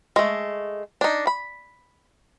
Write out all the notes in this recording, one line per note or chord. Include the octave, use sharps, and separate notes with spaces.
G#3 A3
D4 D#4
B5